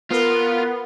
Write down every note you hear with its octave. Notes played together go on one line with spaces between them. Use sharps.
B3 F4 A#4